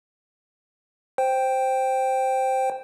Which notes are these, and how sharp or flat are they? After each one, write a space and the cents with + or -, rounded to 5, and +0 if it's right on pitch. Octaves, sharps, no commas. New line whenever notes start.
C5 +0 G5 +0